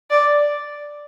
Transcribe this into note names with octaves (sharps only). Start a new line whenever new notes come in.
D5